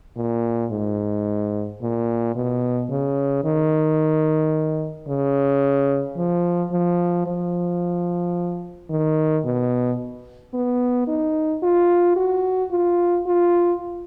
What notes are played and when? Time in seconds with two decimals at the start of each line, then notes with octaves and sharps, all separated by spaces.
0.17 A#2
0.71 G#2
1.81 A#2
2.35 B2
2.90 C#3
3.44 D#3
5.08 C#3
6.17 F3
6.72 F3
7.26 F3
8.90 D#3
9.45 B2
10.54 B3
11.07 D#4
11.63 F4
12.17 F#4
12.71 F4
13.26 F4